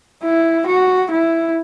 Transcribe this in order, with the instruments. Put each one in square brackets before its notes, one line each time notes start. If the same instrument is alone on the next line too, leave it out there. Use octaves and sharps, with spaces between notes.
[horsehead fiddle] E4
F#4
E4